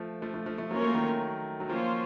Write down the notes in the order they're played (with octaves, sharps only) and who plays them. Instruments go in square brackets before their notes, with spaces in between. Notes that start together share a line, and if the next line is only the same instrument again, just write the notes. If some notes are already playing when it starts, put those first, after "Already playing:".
Already playing: [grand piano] F3 A3
F3 A3
F3 A3
F3 A3
F3 A3
[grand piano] F#3 [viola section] A#3 C#4 F4 A#4 C#5
[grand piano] A3
D#3 F#3
F#3
[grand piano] F3 [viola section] A#3 C#4 F4 C5